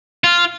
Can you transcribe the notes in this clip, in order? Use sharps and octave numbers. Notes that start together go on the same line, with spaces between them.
F4